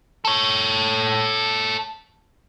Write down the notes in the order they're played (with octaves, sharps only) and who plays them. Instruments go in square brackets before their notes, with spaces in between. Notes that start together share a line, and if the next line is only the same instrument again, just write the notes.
[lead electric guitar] A4 C#5